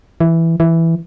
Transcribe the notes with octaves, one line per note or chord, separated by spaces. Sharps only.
E3
E3